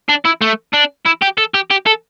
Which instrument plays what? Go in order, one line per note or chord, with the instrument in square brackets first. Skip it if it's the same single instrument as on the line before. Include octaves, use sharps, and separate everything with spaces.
[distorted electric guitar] D4
E4
A3
D4
E4
G4
A4
G4
G4
A4